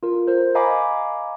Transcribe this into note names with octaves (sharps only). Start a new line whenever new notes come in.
F4 A#4
A#4 C5
D#5 F5 G#5 A#5 B5 D6